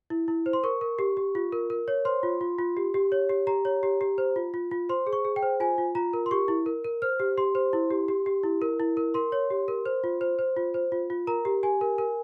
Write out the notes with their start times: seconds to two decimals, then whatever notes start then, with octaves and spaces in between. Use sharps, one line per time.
0.10 E4
0.28 E4
0.46 C5
0.53 C6
0.63 A#4 C#6
0.81 A#4
0.99 G4
1.17 G4
1.35 F4
1.52 A#4
1.70 A#4
1.88 C#5
2.05 C5 C6
2.23 F4
2.41 F4
2.59 F4
2.77 G4
2.94 G4
3.12 C#5
3.30 G4
3.47 G4 A#5
3.65 C#5
3.83 G4
4.01 G4
4.18 C5
4.36 F4
4.54 F4
4.71 F4
4.89 C5 C6
5.07 G#4
5.13 C#6
5.25 G#4
5.36 G5
5.42 C5
5.60 F4 G#5
5.78 F4
5.95 F4 A#5
6.13 A#4
6.26 C6
6.31 G4 C#6
6.48 E4
6.66 A#4
6.85 A#4
7.02 C5 F6
7.20 G4
7.38 G4 C6
7.55 C5
7.73 E4
7.90 G4
8.08 G4
8.26 G4
8.43 E4
8.62 A#4
8.80 E4
8.97 A#4
9.14 A#4 C6
9.32 C#5
9.50 G4
9.68 A#4
9.86 C5
10.04 F4
10.21 C5
10.39 C5
10.57 F4
10.74 C5
10.92 F4
11.10 F4
11.27 A#4 A#5
11.45 G4
11.63 G4 G#5
11.81 A#4
11.98 A#4